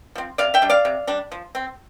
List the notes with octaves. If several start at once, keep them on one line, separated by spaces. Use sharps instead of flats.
F3 C4
C3 D5 F5
E5 G5
G3 D4
D5 F5
C3
G3 D4
F3
C4